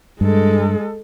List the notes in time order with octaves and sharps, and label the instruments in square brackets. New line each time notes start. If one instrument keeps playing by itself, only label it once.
[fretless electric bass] G2 [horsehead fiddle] G#3 A4